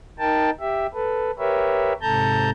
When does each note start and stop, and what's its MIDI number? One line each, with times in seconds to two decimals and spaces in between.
0.19 0.50 63
0.19 0.50 70
0.19 0.50 79
0.19 0.50 81
0.60 0.86 67
0.60 0.86 76
0.94 1.31 69
0.94 1.31 71
1.39 1.93 67
1.39 1.93 70
1.39 1.93 71
1.39 1.93 73
1.39 1.93 76
2.02 2.50 44
2.02 2.50 48
2.02 2.50 69
2.02 2.50 81
2.02 2.50 82
2.02 2.50 91